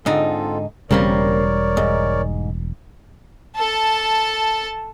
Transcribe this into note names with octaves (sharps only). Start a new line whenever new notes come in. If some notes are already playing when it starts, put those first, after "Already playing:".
G#2 D3 C4 D#4 F4 A4
E1 C#3 G3 A#3 C4 A#4 C#5 D5
G#2
A4 A5